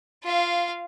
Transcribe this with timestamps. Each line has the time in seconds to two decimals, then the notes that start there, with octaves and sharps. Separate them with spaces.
0.23 F4 F5